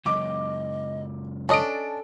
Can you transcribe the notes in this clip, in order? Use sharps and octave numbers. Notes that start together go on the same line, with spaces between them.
C#2 F#2 D#5 D6
C#4 D4 A4 D#5 A5 D7